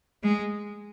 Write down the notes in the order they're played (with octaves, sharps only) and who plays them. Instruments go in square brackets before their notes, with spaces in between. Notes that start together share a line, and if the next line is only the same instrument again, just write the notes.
[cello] G#3